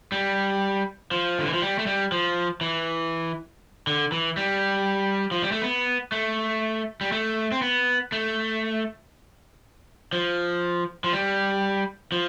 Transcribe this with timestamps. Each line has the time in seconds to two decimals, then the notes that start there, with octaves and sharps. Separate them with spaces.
0.12 G3
1.11 F3
1.39 D3
1.46 E3
1.53 F3
1.62 G3
1.79 A3
1.87 G3
2.12 F3
2.61 E3
3.87 D3
4.12 E3
4.37 G3
5.31 F3
5.42 G3
5.52 A3
5.62 B3
6.12 A3
7.01 G3
7.12 A3
7.52 C4
7.62 B3
8.12 A3
10.13 F3
11.04 F3
11.13 G3
12.12 F3